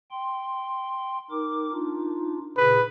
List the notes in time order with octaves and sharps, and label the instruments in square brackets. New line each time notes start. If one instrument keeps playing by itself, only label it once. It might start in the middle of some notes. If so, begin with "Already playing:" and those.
[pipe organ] G5 C6
D#4 A#4 D6
D4 D#4 F4
[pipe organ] A#2 C#3 G#4 [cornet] B4